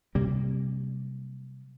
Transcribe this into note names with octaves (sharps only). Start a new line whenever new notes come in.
C3 F#3 G3 A#3